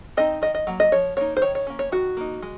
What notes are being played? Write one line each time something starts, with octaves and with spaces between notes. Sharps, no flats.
C4 D#4 D#5
D#3 D#5
D#5
F#3 A#3
D#5
F3 C#5
A#3 D#4 C#5
C5
D#3 C#5
C#5
A#3 C#4
C#5
D#3 F#4
A#3 D#4
G#3